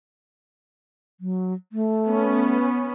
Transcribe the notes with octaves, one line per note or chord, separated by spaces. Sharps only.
F#3
A3
B3 C#4